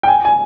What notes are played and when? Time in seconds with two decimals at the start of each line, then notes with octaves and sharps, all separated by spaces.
0.03 G5
0.08 G#5
0.25 G#5